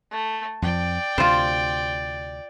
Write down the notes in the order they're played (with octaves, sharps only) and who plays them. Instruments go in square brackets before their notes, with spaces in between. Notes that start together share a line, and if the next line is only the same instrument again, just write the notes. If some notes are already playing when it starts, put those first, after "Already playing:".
[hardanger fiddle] A3
[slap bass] F2 F3 [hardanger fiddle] D5 G5
[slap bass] D2 C3 [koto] F4 C5